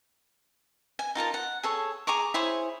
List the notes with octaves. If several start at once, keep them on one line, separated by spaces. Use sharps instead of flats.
G#5
D#4 F4 A#4 A5
F#5
G#4 A4 C#5
G#4 A#5 C#6 D6
E4 G#4 C5 C#5